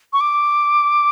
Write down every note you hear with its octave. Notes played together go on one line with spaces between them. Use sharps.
C#6
D6